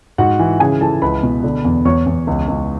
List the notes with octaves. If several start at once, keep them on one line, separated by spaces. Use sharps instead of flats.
G#2 F#4 F#5
E3
C#3 G#4 G#5
E3 A4 A5
C#2 B4 B5
B2
D3
E2
E2 C#5 C#6
E2
C#2
C#2